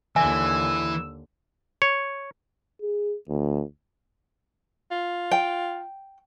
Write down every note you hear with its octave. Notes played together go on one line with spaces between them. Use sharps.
D#2 D3 E3 E5 G#5 E6
C#5
G#4
D2
F4
G5